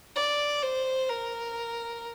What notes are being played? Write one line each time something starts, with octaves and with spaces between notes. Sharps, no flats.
D5
C5
A#4